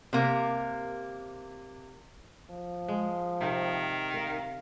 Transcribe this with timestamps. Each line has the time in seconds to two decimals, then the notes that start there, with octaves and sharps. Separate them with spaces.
0.13 C3 A#3
2.50 F3
2.88 G#3
3.41 C3 D#3
4.14 A#4 F5